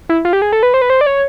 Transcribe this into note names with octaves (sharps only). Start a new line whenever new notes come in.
E4
F4
G4
G#4
A4
B4
C5
B4
C5
D5
C#5